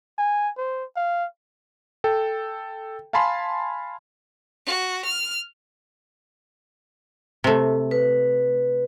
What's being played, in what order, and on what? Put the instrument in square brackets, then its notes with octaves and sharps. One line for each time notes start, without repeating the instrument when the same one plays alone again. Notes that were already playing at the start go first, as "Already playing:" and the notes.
[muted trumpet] G#5
C5
F5
[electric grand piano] A4 G5
F5 G#5 A5 B5 C6
[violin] F#4
F6
[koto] C3 A3
[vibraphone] B4